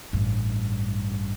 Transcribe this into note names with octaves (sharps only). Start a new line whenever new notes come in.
A1 G2